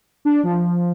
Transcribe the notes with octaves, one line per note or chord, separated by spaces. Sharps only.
D4
F3